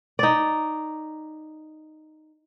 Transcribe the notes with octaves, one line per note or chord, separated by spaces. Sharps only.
D#4 D5